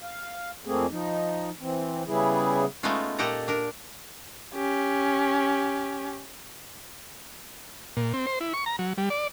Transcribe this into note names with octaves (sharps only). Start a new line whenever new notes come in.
F5
F2 A3 A#3 C4 G#4
F3 D#4
E3 C4
C#3 G3 B3 E4 G#4
G#3 A3 B3 C#4 D#4 F4
A#2 G4 A4 D#5 F#5 A#5
D4 A#4
C#4 G4
A#2
C4
C5
E4
C#6
A#5
F#3
G3
D5